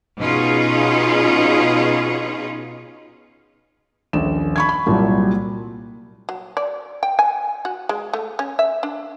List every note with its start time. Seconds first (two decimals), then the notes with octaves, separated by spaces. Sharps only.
0.19 B2 C#4 D#4 F4 G#4
4.13 D#1 A#1 E7
4.56 B5 C#6 G#6
4.69 B5
4.86 C2 A#2 F#3 G3
6.29 F#3
6.57 D5
7.03 G5
7.19 G#5
7.65 F#4
7.89 G#3
8.13 A3
8.39 C#4
8.59 E5
8.83 D4